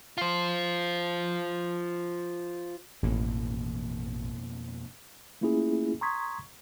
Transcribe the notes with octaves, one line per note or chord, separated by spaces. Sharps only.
F4 C5
A1 F2 B2 A#3
A3 A#3 C#4 E4 F4 G#4
A#5 C6 C#6 D#6 G#6 B6